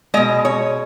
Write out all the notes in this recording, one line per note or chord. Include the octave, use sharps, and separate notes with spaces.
B2 G#3 D#5
C#5